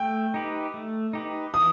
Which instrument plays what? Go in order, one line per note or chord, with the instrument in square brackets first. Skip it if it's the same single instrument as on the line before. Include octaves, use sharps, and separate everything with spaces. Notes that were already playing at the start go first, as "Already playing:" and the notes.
Already playing: [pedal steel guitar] A3 [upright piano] G5
[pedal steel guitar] D#4 G4 B4
A3
D#4 G4 B4
[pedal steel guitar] E3 [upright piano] D#6